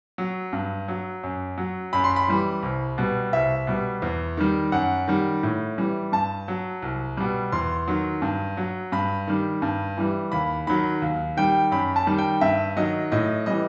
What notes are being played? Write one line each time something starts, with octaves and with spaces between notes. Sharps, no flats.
F#3
G2
F#3
F#2
F#3
F#2 B5
C6
B5
E3 G3
C2
B2 G3
C2 E5
B2 G3
E2
D#3 G3
F#2 F#5
D#3 G3
A2
E3 G3
G2 A5
F#3
C2
B2 G3
E2 C6
D#3 F#3
G2
F#3
G2 B5
D#3 G3
G2
E3 G3
D#2 B5
D#3 F#3 B5
D#2
D#3 G3 G5
F#2 B5
A5
D#3 G3
G5
G2 E5
D#3 F#3 D#5
A2 D#5
E3 G3 D#5